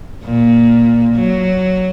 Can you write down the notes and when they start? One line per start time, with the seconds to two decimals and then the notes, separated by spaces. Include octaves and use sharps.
0.24 A#2
1.15 F#3